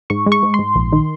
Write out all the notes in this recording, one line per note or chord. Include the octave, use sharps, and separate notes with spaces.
G#2 C#6
G#3
C#6
G#2
C6
G#2
A#1
D#3